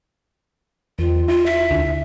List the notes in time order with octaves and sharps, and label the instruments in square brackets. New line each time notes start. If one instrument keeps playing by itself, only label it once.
[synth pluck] E2 [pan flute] F4
[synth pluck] E4 [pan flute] F4
[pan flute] E5
[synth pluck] D2 D3